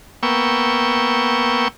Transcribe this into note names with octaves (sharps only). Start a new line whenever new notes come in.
A#3 B3 G5 C#6 E6